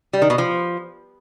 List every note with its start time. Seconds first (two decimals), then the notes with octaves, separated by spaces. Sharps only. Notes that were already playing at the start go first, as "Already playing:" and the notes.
0.13 G3
0.22 D#3
0.30 B2
0.38 F3